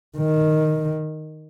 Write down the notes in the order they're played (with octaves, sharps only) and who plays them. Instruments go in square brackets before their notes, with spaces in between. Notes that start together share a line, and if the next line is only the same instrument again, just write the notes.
[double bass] D#3